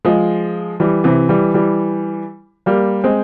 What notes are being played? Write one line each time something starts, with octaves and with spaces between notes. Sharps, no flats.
F3 G#3
E3 G3
C3 E3
E3 G3
E3 G3
G3 A#3
G#3 C4